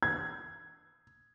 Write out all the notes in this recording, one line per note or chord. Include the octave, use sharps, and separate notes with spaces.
G#6